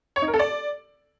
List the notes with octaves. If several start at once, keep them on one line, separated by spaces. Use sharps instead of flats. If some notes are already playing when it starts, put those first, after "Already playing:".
C#5
D#4
A#4
A4
D5